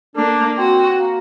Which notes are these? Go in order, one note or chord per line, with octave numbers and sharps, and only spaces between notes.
A#3 D4
C4 F#4
A#3